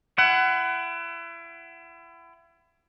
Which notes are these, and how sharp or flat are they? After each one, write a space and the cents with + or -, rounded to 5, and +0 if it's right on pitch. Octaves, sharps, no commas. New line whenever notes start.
E4 +35 F#5 +25